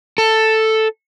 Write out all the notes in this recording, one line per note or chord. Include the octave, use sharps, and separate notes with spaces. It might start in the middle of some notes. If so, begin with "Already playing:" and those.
A4